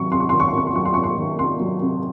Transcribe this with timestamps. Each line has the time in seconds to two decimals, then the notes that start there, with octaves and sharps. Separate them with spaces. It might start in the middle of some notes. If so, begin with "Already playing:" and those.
Already playing: C3 D#3 F#3 C#6
0.11 C3 C6
0.20 C#6
0.29 D#3 C6
0.40 C#6
0.48 C6
0.54 C3 C#6
0.67 C6
0.75 F#3 C#6
0.85 C6
0.94 C3 C#6
1.04 C6
1.18 D#3
1.38 C3 C6
1.60 F#3
1.81 C3